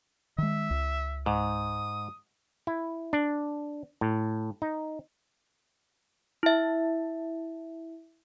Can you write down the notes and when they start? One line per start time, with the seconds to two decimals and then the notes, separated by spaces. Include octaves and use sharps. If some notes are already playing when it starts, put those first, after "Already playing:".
0.38 D#3 G#3 E5
0.71 C#2
1.26 G#2 D#6
2.67 E4
3.13 D4
4.01 A2
4.62 D#4
6.43 E4 E5